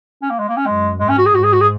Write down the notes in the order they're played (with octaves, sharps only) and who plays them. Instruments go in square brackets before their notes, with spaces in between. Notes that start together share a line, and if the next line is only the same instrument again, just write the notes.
[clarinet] C#4
A#3
G#3
A#3
C#4
[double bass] F#2 [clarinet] G#3
[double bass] G#2 [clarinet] G#3
[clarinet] C#4
F#4
G#4
[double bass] G#2 [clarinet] F#4
[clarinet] G#4
F#4
G#4